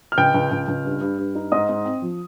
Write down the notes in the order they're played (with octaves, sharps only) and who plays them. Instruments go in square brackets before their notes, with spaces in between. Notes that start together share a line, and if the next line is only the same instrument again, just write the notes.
[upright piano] F6
C#2 G5 G6
C#2
C#2
C#2
G2
G2
G2
D#4
G#2 D#5 D#6
G#2
C4
F3